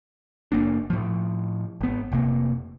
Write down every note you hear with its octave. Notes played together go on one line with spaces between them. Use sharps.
F#1 A#3 D4
A2 F3
G#1 B3
F1 C3 A#3